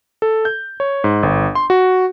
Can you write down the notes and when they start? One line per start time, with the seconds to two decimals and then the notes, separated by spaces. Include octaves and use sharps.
0.22 A4
0.45 G6
0.80 C#5
1.04 G#2
1.23 G1
1.55 C6
1.70 F#4